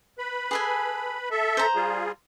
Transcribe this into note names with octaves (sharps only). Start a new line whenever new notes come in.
B4 B5
G#4 A4 G#5
A4 E5
C5 A#5
G3 F4 G#4